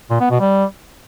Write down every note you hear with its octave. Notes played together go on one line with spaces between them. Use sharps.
A#2
B3
B2
G3